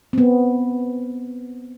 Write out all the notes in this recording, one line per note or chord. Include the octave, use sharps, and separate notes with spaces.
B3 C4